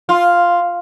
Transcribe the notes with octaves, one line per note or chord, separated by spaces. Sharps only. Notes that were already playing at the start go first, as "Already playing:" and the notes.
F4